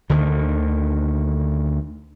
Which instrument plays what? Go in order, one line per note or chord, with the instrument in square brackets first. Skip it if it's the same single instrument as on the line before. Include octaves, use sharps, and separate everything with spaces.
[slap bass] D2 D3 D#3